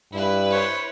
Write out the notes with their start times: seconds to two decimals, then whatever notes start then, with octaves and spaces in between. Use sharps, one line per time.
0.12 G2 E4 B4
0.51 C5 C#5